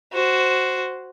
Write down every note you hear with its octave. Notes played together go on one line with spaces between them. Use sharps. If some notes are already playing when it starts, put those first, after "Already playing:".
F#4 C5